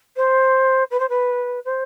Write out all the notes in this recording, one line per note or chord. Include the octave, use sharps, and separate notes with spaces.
C5
B4
C5
B4
C5